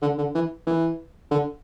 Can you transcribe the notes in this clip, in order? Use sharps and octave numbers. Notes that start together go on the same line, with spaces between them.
D3
D3
E3
E3
D3